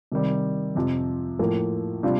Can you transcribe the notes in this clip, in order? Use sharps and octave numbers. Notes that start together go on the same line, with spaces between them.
C3 D#3 G3
F2 C3 F3
A2 F3 A#3
C3 G3 D4 F4